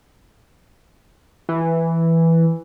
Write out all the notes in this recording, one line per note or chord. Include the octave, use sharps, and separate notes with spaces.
E3